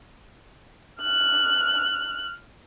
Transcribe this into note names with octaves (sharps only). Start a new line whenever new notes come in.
F6 F#6